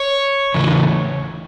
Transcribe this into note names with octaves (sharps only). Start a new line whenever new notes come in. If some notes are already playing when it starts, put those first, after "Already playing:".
Already playing: C#5
E2 C#3 E3